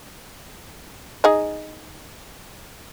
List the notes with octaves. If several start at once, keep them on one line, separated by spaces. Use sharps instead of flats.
D#4 G#4 D#5